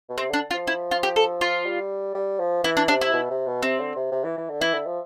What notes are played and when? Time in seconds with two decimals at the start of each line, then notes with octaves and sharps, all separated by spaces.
0.09 B2
0.17 C3 C4
0.30 D3 D4
0.51 F4
0.54 F3
0.67 E4
0.91 F4
1.03 G4
1.16 A4
1.41 F4
1.66 G3
2.14 G3
2.39 F3
2.64 E3 E4
2.77 D4
2.88 C3 D4
3.01 E4
3.13 B2
3.30 C3
3.46 B2
3.63 C3 C4
3.79 D3
3.96 C3
4.12 C3
4.24 E3
4.37 E3
4.50 D3
4.61 E3 E4
4.74 D3
4.86 F3